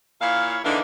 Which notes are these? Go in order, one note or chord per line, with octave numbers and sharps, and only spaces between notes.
A#2 E4 C#5 F5
D3 E3 A#3 D4 D#4